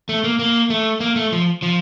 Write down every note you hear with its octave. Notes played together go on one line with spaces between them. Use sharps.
A3
A#3
A#3
A3
A#3
A3
F3
F3